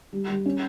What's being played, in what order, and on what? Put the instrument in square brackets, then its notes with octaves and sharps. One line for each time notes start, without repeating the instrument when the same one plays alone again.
[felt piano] G3
G3
C#4